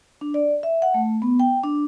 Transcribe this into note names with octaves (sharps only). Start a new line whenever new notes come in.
D4
D5
E5
F#5
A3
B3
G5
D4